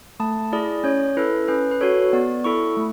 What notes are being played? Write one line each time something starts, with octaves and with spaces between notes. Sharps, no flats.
A3 A5
E4 G#4 D5
C#4 C#5
E4 A4 B4
C#4 B4
B4
F#4 A4 C#5
B3 D5
E4 A4 C#6
A3